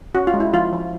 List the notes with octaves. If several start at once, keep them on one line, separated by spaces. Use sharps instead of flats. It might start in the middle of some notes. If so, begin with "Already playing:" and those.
C#4 F#4
F4
G#3
E4
F3 F4
F3